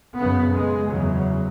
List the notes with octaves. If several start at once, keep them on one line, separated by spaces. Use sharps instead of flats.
F#2 C#3 B3
G#3
E2 C#3 F#3